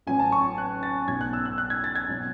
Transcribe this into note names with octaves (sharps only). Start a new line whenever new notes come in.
A1 A2 F#3 G#5
A5
C#6
F#6
A6
B1 B2 F#3 G#6
F#6
E6
F#6
F#6
G#6
A6
G#6
B2 F#3